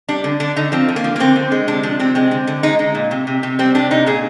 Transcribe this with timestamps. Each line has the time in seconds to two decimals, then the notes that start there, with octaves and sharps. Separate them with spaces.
0.08 G3 D4
0.24 D3
0.40 D3 D4
0.56 D3 D#4
0.72 F3 C4
0.88 D3
0.96 A#3
1.04 F3
1.16 A#3
1.20 D3 C4
1.36 D3
1.52 G#3
1.68 C3 D4
1.83 F3 D4
1.99 C3 C4
2.15 G#3 C4
2.31 D3
2.47 D3
2.63 G#3 D#4
2.79 G#3
2.95 A#2
3.11 C3
3.27 C3
3.43 C3
3.59 G3 C4
3.75 C3 D4
3.91 C3 D#4
4.06 A#2 G#4